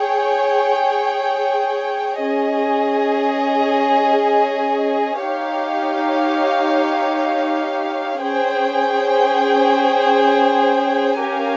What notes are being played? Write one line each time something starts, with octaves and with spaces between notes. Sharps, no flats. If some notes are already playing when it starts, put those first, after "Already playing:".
Already playing: G#4 C#5 G5
C#4 G#4 D#5
D#4 G4 C#5 F5
C#4 G#4 C5 G5
C#4 G4 A#4 F5 G#5